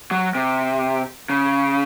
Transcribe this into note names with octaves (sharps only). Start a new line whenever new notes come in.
F#3
C3
C#3